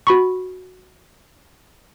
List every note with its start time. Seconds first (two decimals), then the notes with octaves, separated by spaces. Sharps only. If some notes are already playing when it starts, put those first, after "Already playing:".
0.07 F#4 B5 C#6